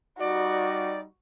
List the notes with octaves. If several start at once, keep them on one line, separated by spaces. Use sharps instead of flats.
G3 D#4 F#4 D5